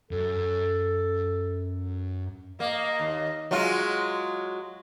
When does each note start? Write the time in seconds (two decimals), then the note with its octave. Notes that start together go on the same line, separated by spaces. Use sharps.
0.11 F#2 A4
2.60 A#3 D#5
3.00 D#2
3.51 F#3 G#3 F4